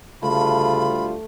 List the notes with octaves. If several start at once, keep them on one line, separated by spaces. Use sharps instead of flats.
D2 C#3 G3 A3 F4 B5